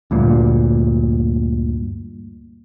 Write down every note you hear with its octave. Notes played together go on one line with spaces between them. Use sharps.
D2 G2 A#2